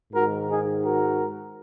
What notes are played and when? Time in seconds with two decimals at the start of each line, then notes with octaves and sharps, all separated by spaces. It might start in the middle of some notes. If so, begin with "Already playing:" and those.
0.13 G#2 D#3 F#4 A#4
0.48 D#4 G#4
0.82 F#4 A#4